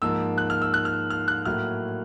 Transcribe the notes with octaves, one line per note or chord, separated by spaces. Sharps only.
G#2 F3 A#3 E6
F#6
F6
E6
F#6
F6
F6
F#6
A2 F#3 A#3 F6